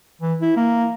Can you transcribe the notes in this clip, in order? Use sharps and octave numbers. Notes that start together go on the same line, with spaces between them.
E3
E4
A#3